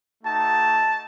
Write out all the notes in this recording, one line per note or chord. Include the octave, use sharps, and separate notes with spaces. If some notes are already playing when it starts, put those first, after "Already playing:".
A3 D#4 F#4 A5